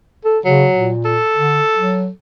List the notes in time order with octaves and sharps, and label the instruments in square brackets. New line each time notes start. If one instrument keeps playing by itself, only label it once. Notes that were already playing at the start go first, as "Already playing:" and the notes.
[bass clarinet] A4
[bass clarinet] C#3 [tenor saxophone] F#3
[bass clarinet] A#2
[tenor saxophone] A4
[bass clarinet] D3
F#3